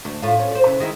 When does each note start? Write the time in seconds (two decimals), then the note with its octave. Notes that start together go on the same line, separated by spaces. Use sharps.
0.05 D2
0.22 A2 F4
0.39 C#4
0.51 C5 D5
0.66 C#3 E3
0.80 D#3 G#3 E4